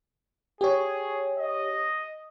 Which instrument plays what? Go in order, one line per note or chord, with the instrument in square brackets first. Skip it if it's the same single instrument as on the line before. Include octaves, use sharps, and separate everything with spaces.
[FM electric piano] G4 C#5 [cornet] G#4
[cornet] D#5